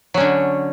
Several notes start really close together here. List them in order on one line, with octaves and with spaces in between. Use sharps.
F#3 C#4 D3